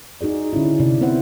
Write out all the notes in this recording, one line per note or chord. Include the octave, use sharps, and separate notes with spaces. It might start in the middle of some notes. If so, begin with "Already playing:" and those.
D#4 F#4 G#4 D5
D3 C#4 E4
C3 D5
B3 C4 E4 C5 E5 F#5